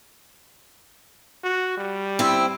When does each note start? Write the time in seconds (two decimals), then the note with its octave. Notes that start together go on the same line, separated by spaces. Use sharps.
1.44 F#4
1.77 G3
2.19 C4 E4